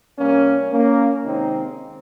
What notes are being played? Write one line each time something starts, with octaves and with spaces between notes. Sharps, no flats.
C3 G3 A#3 C#4
A#3 C#4
C3 D#3 G#3 C4 D#4